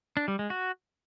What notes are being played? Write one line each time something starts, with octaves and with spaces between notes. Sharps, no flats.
D4
G3
G#3
F#4